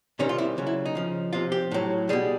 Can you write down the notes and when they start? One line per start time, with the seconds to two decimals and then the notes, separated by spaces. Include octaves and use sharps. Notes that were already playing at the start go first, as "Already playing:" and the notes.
0.19 C3 D#3 G3 C#4
0.29 F4
0.38 E4
0.58 C#3 F#3
0.67 E4
0.86 D#4
0.95 C#3 F3
1.33 C3 F3 F4
1.52 G4
1.71 A2 F#3
2.09 B2 G3 G#4